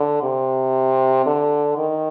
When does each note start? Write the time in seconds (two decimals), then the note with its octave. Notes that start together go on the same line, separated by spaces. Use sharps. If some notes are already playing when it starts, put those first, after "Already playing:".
Already playing: D3
0.23 C3
1.26 D3
1.78 D#3